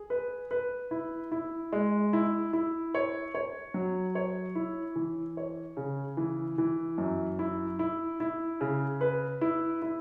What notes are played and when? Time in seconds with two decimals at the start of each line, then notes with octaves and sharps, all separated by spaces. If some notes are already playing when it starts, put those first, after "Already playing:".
Already playing: G#4
0.10 B4
0.51 B4
0.91 E4
1.32 E4
1.73 G#3
2.13 E4
2.53 E4
2.95 C#5
3.35 C#5
3.74 F#3
4.15 C#5
4.55 E4
4.96 E3
5.37 C#5
5.77 C#3
6.17 E3
6.58 E3
6.98 F#2
7.39 E4
7.79 E4
8.20 E4
8.61 C#3
9.01 B4
9.41 E4
9.82 E4